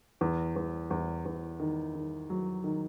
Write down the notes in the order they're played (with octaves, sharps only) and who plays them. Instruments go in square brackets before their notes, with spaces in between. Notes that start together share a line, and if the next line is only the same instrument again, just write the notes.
[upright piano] E2
E2
E2
E2
D#3
D#3
F#3
D#3